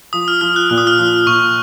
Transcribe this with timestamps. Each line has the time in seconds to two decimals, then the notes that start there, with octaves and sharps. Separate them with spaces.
0.13 F3 D#6
0.28 F6
0.41 F3 F6
0.56 F#6
0.70 A#2 F6
0.78 D#6
0.87 F6
0.99 F3
1.27 A#2 C#6